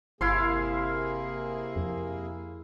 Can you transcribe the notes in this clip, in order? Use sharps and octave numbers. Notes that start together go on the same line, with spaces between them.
G1 C3 A#3 E4 G#4 F5 C6
F2